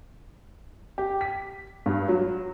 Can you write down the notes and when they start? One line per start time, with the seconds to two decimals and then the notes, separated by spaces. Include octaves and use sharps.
0.98 G4
1.21 B6
1.86 G2
2.09 F#3